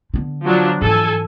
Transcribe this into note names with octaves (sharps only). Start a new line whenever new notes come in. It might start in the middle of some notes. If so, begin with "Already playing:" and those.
D3 B3
F3 F#3 D4
G#2 E3 A4 G#5